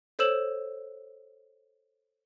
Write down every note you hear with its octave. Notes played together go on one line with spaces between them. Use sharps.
A4 C5 C#5 E6 E7 F#7